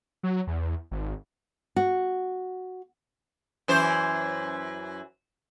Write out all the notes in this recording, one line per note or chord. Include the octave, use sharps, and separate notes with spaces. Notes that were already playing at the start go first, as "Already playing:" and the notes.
F#3
E2
G#1
F#4
F#2 E3 C5